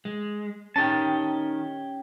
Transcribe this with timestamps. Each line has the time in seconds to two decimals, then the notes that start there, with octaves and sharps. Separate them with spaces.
0.05 G#3
0.76 D#3 C#4 G4 A5